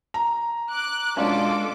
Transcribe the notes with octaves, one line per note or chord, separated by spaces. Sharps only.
A#5
D6 F#6
B2 G#3 C#4 D4 F4 A4 D6